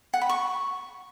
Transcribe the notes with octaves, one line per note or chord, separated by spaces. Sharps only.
F#5
B5
C#6